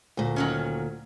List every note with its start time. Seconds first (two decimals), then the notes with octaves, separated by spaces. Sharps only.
0.17 D2 A#2
0.36 D#3 F#3 C#4